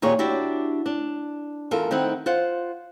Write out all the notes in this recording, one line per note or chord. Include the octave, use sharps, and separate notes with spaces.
D#2 A#2 G#4 C#5
D4 E4 F#4 G4
D4
E2 F4 A4 A#4
D#3 C4 E4 F#5
F4 C5 F#5